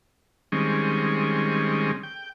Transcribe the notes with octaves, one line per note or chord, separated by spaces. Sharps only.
D#3 G3 G#3 C4 C#4
G5